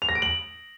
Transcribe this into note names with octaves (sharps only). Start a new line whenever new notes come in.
F7
A#6
D7
F#7